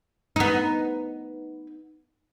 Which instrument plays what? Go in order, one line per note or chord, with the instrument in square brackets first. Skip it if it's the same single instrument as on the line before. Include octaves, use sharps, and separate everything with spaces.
[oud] B3 D#4